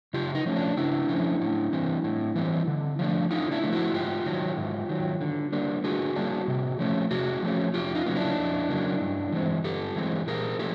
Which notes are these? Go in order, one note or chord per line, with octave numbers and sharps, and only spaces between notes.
C#3 F4 G4
D#4
F3 A3 C#4
D4
C#3 D4 E4
F3 A3 C#4
A2
E3 G3 C4
A2
E3 G3 C4
D3
F3 A3 D4
D3 D#4 F4
D4 E4
F3 A3 D4
E4 F#4
G#2 F4 G4
D#3 F#3
G#2
D#3 F#3
D3
G3 A#3 D4
D3 F#4 G#4
G3 A#3 D4
C3
F3 A3 C#4
C3 F#4 G#4
F3 A3 C#4
F2 F4 G4
D#4 F4
C#3 F#3 A#3
D4 E4
F2
C#3 F#3 A#3
G2
E3 G#3 C4
G2 G4 A4
E3 G#3 C4
A#2 G#4 A#4
F3 A#3 G4 A4